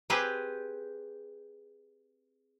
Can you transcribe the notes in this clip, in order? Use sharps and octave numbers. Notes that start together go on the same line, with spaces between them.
C4 G4 G#4 B4